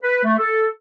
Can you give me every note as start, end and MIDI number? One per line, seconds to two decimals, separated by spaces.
0.02 0.21 71
0.24 0.37 57
0.38 0.67 69